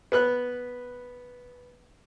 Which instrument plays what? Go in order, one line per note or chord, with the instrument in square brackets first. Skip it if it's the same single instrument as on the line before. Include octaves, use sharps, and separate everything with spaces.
[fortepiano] B3 B4 F#6